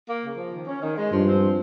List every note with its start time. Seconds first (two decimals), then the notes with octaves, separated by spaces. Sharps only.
0.08 A#3
0.23 C#3
0.37 F3
0.53 D#3
0.67 C#4
0.83 D#3
0.97 G#3
1.12 G2 F3
1.27 C4
1.42 F3